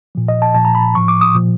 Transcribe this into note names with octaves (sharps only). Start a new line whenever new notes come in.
A#2 F3
D#5
A5
A#2 F3 A5
A#5
B5
A2 F3 C#6
D6
D#6
A#2 F3